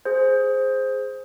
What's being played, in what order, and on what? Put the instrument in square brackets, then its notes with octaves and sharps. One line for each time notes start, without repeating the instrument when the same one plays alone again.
[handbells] G#4 C5